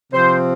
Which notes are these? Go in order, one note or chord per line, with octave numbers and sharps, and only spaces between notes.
C3 F3 C4 C5